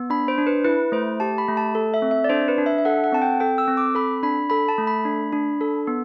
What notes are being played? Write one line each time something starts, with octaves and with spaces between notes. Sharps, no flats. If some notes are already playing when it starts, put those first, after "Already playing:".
Already playing: B3
D4 B5
C5
D4
B4
E4 B4
A3 C5
G4 A5
B5
A3
A5
A4
E5
C4
E5
D5
D4 C5
B4
D4
E5
E5
A4 F#5
F#5
C4 A5
G5
A4 G5
E6
C4
D6
A4 B5
D4 B5
A4 B5
A5
A3
B5
D4
D4
A4
B3